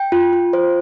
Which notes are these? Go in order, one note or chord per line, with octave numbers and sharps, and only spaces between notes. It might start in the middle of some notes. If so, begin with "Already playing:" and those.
Already playing: G5
F4
F4
C5